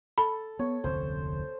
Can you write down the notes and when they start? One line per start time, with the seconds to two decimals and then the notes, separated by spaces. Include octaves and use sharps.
0.18 A4 B5
0.59 B3 C#5
0.84 F1 D2 C4 C5